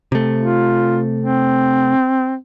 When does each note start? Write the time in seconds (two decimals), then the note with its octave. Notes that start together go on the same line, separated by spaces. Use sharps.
0.12 C3 A3
0.38 F4
1.20 C4